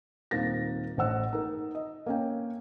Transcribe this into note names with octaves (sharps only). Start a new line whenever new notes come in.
D#1 D#3 A#3 C4 A6 A#6
A1 C5 F#5 E6
D#4 A#4
D#5
A#3 C#4 G5